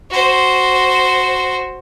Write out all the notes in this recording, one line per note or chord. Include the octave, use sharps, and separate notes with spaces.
F#4 C5